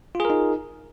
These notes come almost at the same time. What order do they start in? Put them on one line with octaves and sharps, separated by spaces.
F4 G#4 A#4 D#4